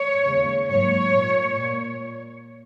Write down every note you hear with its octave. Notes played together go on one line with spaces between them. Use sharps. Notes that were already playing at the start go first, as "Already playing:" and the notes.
Already playing: C#5
D#2 C#3 G#3
G#2 F#3 A#3 C#5
A#2 A#3
A#2